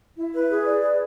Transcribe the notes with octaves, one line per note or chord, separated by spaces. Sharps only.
E4
B4
G#4
D5
B4